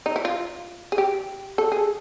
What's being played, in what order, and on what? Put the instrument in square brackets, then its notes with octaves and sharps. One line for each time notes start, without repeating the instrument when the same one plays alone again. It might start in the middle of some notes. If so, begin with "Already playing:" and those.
[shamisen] D#4
E4
F4
G#4
G4
A4
G#4